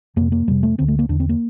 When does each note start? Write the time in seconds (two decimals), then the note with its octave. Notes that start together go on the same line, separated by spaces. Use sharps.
0.16 F2 C3 A#3
0.32 A#3
0.48 F2 C3 G3
0.63 A3
0.78 D2 D3 C4
0.88 A3
0.99 A#3
1.09 E2 D3 D4
1.20 C4
1.29 A#3